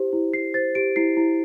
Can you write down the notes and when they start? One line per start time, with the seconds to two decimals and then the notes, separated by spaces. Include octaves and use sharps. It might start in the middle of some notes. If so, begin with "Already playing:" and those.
Already playing: E4 G4 C5
0.13 E4
0.34 E4 C7
0.54 C5 A6
0.75 G4 D7
0.96 E4 C7
1.17 E4